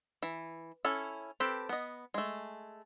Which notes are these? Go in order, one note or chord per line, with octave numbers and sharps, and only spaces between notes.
E3
C#4 E4 A4
C4 G4 A4 B4
B3 D#5
G#3 A3